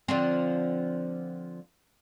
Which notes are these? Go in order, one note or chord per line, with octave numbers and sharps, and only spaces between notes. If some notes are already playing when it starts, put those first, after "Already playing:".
D3 F3 C4